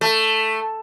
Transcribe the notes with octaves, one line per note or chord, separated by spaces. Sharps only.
A3